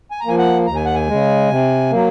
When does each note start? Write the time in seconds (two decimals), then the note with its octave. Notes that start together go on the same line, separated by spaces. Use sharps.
0.11 G#5
0.20 A#5
0.25 F3 A#3 G#5
0.38 F#5
0.66 D#2 A#5
0.76 G#5
0.86 F#5
0.95 G#5
1.08 C#3 G#3
1.50 C3
1.91 F#3 A#3